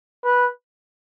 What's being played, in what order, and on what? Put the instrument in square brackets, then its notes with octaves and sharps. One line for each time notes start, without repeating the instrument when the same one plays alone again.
[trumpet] B4